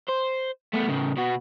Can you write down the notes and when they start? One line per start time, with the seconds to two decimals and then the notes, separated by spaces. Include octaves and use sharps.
0.09 C5
0.74 A3 B3
0.89 A2 C#3
1.17 B2 F#4